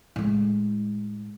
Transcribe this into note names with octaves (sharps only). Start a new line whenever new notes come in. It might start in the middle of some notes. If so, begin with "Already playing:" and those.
A2 G#3